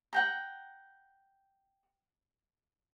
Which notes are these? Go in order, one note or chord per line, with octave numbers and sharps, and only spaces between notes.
F#5 G5 A#5